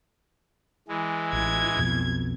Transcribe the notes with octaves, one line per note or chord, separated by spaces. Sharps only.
E3 G#3
A1 G#6
B1 F2 B2